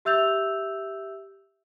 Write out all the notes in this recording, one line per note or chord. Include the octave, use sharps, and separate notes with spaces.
G4 E5 E6 G6 F7